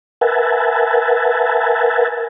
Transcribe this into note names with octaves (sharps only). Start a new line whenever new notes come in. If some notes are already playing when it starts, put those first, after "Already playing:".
A#4 B4 E5 F#5 G#5 A5